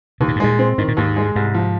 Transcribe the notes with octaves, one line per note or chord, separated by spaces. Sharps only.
D#2 C3
A#2
G#2
A#2 G#3
C4
G#2 D#3
A#2
D#2 G#2
G#3
C2 G#2
F3